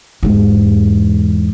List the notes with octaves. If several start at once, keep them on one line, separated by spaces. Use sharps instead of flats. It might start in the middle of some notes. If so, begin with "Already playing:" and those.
E2 G#2